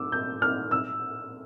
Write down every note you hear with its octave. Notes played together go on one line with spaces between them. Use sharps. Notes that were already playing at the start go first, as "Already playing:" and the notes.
Already playing: D6 E6
G6
F6
E6